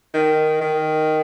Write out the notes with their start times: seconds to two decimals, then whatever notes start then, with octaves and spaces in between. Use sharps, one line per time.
0.14 D#3
0.61 D#3